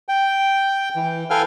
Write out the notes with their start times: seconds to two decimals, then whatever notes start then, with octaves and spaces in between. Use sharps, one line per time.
0.09 G5
0.96 E3
1.30 A4 B4 F5 G5 G#5 F6